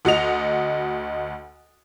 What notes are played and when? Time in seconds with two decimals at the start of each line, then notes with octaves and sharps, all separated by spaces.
0.05 D2 F#4 D#5 F7